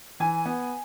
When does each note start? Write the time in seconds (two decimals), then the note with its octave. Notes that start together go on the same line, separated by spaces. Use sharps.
0.20 E3 G#5
0.46 B3